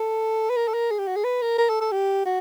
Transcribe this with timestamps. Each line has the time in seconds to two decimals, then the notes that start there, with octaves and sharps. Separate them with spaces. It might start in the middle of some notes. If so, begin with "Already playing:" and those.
Already playing: A4
0.50 B4
0.56 A#4
0.68 A4
0.74 A#4
0.91 G#4
0.98 G4
1.07 F#4
1.16 G#4
1.24 B4
1.42 A#4
1.58 A#4
1.69 A4
1.81 A4
1.92 G4
2.25 F#4